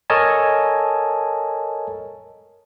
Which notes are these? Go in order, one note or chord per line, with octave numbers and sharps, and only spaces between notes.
A4 A#4 C#5 D#5 G#5 A5